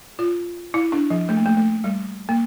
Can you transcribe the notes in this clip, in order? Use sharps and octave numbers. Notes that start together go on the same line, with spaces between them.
F4
E4
D4
F3
A3
A#3
A3
A3
G3
A#3